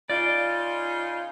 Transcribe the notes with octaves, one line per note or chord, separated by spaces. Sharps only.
C#3 D#4 F4 D5